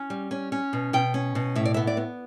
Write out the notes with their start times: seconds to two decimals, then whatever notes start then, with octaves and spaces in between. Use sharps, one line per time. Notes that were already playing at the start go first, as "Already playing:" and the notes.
Already playing: C#4
0.10 G3
0.31 C#4
0.52 C#4
0.73 B2
0.93 B2 G5
1.14 C#4
1.35 B2
1.55 A2 E5
1.65 D5
1.74 B3 E5
1.87 D5
1.97 B3